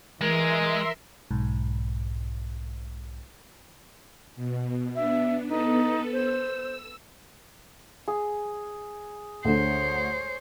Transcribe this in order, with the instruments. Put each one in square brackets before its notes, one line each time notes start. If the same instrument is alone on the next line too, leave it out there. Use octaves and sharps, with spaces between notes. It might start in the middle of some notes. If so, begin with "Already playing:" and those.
[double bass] E3 [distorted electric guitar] G#3 [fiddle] A#4 [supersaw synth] E5 C6
[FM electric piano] B1 G#2
[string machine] B2
[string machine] B3 D4 [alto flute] E5
[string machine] B3 A4 B4 [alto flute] D#4
[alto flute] C5 [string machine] E6
[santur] G#4
[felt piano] D2 D3 [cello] C5 C#5